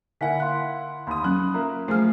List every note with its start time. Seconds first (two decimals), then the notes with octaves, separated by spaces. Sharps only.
0.21 D3 A#3 E4 E5 F#5 G#5 B6
0.40 F5 C6 F#6
1.07 D#2 B5 C6 D#6
1.24 F#3 C#4 F#6
1.54 A#3 F4 E5 A#5
1.88 F3 A3 G#4 C5 F6